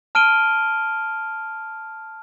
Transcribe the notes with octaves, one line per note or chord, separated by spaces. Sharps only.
A5 F6 D7 D#7 G7